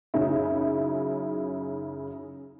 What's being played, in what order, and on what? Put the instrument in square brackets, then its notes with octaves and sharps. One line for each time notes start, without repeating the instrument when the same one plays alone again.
[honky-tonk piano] F#2 C#3 F#3 D#4 E4